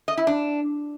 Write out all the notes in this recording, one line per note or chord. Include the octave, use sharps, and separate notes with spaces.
D#5
E4
D4